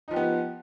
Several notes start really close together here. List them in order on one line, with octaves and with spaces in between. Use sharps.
D#4 F3 G4 B3